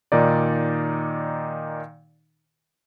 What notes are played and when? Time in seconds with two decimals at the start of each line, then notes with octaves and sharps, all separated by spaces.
0.12 A#2 D#3 D#4 D5